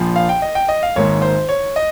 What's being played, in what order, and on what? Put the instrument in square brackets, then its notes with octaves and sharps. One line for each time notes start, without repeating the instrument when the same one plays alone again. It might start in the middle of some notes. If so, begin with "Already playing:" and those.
Already playing: [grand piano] A#1 A#2 F3
F5
G5
D#5
G5
D#5
F5
G#1 G#2 D#3 A#3 C#5
C5
C#5
D#5